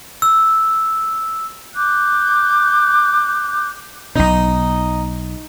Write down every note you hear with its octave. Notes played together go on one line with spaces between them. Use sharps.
E6
D6 F#6 G6
B1 B2 D#4